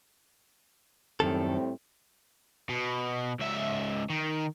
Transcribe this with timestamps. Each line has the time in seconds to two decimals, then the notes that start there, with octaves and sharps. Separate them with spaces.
1.20 F#2 A2 D#3 G3 C4 A4
2.69 B2
3.39 C#2 E5
4.10 D#3